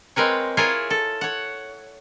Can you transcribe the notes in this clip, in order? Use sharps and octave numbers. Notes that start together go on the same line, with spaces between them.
G#3 C4 A#4 B4 C#5
E4 F4 G#4 A#4 C#5 F5
A4
C#5 F#5